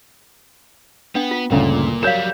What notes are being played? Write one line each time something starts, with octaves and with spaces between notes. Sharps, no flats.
B3 D4 G5
F4
G1 D2 A#2 C#3 E4 G5
F#3 G3 A#4 C#5 F5 G6 E7